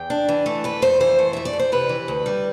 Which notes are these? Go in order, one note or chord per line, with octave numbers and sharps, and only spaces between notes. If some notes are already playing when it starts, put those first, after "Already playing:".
Already playing: E2 G5
D4
E3
A3
F2 B4
F2 C5
E3 C5
A3
F2 E5
D5
F2
C5
C3 B4
E3
D2
G3